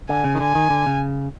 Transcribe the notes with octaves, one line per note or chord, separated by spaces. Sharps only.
D3 G#5
C#3
D#3
D3 G#5
D#3
D3
C#3